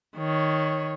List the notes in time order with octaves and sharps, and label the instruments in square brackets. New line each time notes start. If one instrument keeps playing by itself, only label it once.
[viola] D#3 C#5